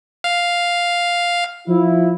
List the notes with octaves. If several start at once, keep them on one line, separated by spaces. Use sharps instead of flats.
F5
F3 E4